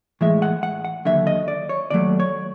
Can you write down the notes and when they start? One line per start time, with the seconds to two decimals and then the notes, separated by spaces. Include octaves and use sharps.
0.21 A2 E3 G#3 E5
0.42 F#5
0.63 F#5
0.85 F#5
1.05 D#2 D3 F#3 E5
1.27 D#5
1.48 D5
1.69 C#5
1.90 D#2 D#3 F#3 A3 D5
2.20 C#5